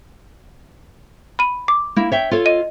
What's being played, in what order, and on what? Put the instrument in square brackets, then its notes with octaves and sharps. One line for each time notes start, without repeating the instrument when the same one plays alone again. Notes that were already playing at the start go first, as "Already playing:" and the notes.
[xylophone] B5 D#7
D6
[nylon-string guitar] A#3 E4
C#5 E5 G5
F4 A4 C#5
[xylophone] D#5 D#7